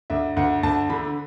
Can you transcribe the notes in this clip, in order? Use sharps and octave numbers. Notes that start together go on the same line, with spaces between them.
D2 E5
D2 F#5
D2 A5
D3 B5